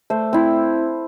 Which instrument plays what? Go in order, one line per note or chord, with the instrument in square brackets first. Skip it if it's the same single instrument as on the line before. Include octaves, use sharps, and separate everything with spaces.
[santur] A3 C5
C4 E4